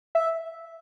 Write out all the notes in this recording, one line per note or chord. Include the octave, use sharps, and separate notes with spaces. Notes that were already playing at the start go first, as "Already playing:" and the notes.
E5